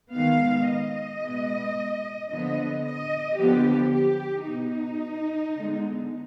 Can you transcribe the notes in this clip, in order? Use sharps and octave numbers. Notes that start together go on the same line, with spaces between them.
D#3 G#3 B3 F5
D#5
B2 G#3 B3
D3 F3 B3 D#5
D#5
D3 F3 B3 G4
G4
B2 B3 D#4
D3 G#3 B3